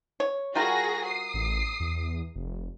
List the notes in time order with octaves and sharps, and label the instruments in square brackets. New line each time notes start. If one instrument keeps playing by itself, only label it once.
[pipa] C#5
[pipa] G3 F4 A#4 [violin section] F#4 G#4 A#6
[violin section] D#6 C7
[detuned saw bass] A1
E2
F1